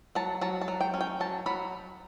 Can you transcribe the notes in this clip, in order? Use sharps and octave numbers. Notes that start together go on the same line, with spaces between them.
F#3 A5
F#3 A5
A5
F#3
G5
C#4
G5
F#3 A5
F#3 B5